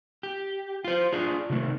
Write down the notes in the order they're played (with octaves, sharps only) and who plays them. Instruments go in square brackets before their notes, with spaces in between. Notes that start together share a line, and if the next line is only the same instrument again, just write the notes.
[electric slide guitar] G4
F4 C5
D4 F4 G#4
C3 D#3 A3